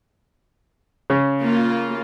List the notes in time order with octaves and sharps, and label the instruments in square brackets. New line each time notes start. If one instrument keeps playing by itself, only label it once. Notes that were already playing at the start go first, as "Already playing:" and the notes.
[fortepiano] C#3
[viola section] A#3 F4